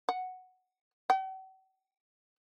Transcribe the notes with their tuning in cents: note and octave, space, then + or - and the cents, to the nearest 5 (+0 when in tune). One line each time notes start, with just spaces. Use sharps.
F#5 +0
F#5 +45